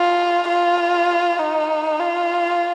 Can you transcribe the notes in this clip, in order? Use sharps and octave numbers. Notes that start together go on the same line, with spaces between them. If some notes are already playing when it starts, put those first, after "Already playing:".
Already playing: F4
F4
D#4
F4